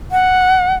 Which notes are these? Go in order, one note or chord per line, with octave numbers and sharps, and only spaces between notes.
F#5